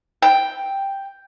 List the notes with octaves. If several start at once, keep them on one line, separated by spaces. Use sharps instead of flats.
G5